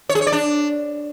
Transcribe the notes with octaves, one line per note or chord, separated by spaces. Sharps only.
C#5
G#4
C#5
D5
D4